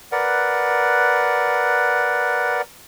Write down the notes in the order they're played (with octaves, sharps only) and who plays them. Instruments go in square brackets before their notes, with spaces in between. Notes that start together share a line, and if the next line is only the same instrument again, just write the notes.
[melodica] A#4 B4 D5 F#5